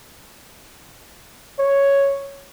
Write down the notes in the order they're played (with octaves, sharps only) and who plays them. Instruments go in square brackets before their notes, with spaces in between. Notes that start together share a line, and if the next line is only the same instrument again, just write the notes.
[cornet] C#5